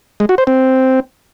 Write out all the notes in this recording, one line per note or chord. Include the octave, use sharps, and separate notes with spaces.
G#3
F#4
C5
C4